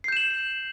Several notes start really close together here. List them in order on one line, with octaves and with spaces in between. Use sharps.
C7 G6 E7 F#7